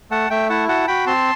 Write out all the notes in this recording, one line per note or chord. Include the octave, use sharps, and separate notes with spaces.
A3 F#5 A5
A3 E5 G5
E4 F#5 A5
F#4 F#5 A5
F#4 G5 B5
C4 A5 C6